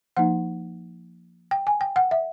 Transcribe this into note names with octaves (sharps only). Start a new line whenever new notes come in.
F3 A#3 D#4 F#5
G5
G#5
G5
F#5
E5